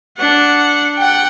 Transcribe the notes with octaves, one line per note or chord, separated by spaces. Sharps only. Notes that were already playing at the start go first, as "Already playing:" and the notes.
D4 F#5
F#5 G5